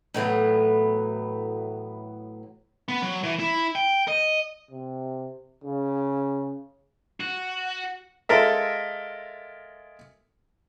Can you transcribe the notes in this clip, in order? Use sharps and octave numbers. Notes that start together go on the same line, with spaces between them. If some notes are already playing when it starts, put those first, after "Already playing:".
A2 E3 F#3 B3
B3
F#3
E3
E4
G5
D#5
C3
C#3
F#4
G#3 F4 A4 A#4 E5